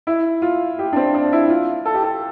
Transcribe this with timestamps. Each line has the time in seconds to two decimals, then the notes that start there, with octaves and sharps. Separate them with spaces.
0.07 E4
0.42 F4
0.79 G4
0.93 D4
0.96 C4
1.14 D4
1.33 E4
1.49 F4
1.86 A4
1.94 G4
2.03 A4